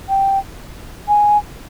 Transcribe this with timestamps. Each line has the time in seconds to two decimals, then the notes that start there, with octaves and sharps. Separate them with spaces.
0.09 G5
1.08 G#5